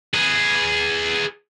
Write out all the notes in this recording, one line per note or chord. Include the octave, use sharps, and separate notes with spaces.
G#4 B4